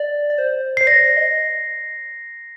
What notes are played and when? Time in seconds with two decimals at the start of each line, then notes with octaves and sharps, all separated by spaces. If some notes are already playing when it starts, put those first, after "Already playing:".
Already playing: D5
0.30 D5
0.38 C5
0.77 C5 C7
0.87 D5 A#6
1.17 D#5